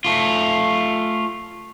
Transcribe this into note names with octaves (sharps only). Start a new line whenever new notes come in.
A3 F4